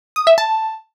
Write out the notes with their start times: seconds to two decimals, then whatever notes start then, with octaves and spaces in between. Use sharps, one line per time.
0.16 D#6
0.27 E5
0.38 A5